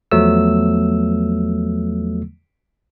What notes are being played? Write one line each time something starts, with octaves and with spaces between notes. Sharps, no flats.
E2 F3 F#3 A3 B3 E6